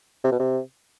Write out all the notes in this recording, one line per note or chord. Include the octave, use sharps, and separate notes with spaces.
C3
B2
C3